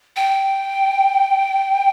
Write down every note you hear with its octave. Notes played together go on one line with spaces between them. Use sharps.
G5